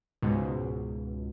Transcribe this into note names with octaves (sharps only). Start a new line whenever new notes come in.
C#2 G#2 B2